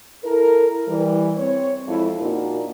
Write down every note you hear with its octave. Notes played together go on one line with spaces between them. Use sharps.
E4 A4 A#4
E3 G3
C4 C#5
F2 G#3 E4
A#2 D4 D#4 F#4 A#4